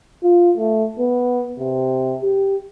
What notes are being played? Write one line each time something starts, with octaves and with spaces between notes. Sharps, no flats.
F4
A3
B3
C3
G4